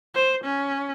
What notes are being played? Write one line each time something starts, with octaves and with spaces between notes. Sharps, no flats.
C5
C#4